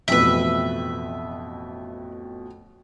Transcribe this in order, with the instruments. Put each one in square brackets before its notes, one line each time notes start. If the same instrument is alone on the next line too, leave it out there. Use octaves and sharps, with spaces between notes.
[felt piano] A1 F2 B2 [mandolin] B4 E5